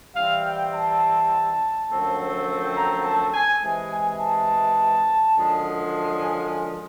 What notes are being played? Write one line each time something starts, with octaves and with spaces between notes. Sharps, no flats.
E3 G3 C4 F5
G5
A5
F#2 D3 F3 A3 C4
A#5
A5
G#5
C3 E3 G#3
G#5
A5
F#2 D3 F3 G#3
G#5